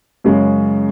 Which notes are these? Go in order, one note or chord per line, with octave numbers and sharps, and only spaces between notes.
F#2 C#3 G#3 C#4